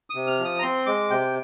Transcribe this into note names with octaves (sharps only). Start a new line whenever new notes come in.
D#6
C3
F6
F3
D#6
A#5
C4 C6
G#3 D6
C3 G5